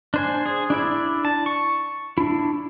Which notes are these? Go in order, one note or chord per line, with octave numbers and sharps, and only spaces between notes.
D4 C5 G#5
G#4
D4 E4 D5
A5
C#6
D4 E4